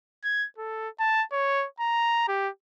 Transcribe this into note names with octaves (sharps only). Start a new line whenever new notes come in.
G#6
A4
A5
C#5
A#5
G4